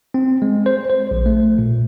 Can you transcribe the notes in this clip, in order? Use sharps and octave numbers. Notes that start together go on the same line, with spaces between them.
C4
G#3
C5
C5
A#1
A3
A#2